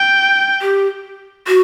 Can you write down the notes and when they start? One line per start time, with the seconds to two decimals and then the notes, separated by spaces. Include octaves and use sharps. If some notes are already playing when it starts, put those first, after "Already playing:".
Already playing: G5
0.62 G4
1.47 F#4